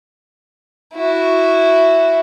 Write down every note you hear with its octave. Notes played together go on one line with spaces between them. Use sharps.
E4 F#4